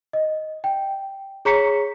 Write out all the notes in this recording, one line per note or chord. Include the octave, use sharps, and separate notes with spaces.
D#5
G5
G#4 C#5 A#5 C#6 B6 C#7